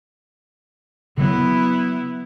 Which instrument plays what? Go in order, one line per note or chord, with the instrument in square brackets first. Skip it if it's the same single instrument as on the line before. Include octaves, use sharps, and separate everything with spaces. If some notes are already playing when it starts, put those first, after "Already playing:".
[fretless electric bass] C#3 F#3 [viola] B3 E4